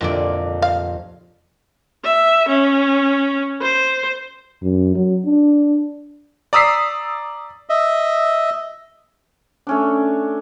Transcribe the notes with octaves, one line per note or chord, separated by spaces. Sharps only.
F1 F2 A#2 D3 D5
F5
E5
C#4
C5
F#2
F#3
D4
D5 A#5 D#6 E6 B6 C7
D#5 E5
A3 C#4 D4